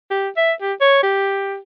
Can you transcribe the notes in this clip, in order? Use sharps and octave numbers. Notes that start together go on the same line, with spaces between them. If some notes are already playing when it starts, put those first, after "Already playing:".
G4
E5
G4
C#5
G4